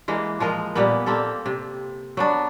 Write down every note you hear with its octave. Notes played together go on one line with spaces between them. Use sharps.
E3 G#3 A#3
F3 G#3 A#4 D#5
A#2 G3 A#3 B3
A#3 C4 G4 A4
C3
F#3 B3 D4